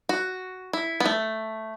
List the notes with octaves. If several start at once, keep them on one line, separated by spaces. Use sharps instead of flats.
F#4
E4
B3
A3